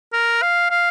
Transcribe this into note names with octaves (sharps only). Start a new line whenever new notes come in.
A#4
F5
F5